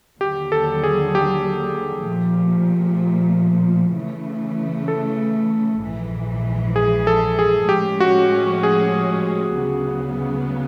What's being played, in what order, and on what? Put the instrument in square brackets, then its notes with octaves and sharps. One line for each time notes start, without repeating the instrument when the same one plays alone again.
[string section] D#2 D3 F#3 [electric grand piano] G4
[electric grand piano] A4
G#4
G4
[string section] A#2 F3 A3
C#3 E3 A3
[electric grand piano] A4
[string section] A#1 G#2 E3
[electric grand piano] G#4
A4
G#4
[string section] A2 F3 G#3 C#4 [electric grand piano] G4
[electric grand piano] F#4
G#4
[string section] D2 C#3 F#3 B3